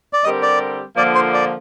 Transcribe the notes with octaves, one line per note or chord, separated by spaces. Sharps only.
D5
D3 G3 C4 G4 A#4 D#5
D5
D3 F3 A#3 D5
C5
D5